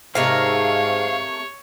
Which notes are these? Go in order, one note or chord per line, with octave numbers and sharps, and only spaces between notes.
G#2 C3 A3 A#4 C#5 F5